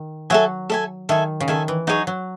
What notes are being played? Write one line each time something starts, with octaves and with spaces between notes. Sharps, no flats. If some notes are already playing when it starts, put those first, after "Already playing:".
Already playing: D#3
F#3 A4 E5 G#5
A4 E5 G#5
D#3 A4 E5 G#5
C#3
D#3 A4 E5 G#5
E3
F#3 D#4 G#4 C#5
F#3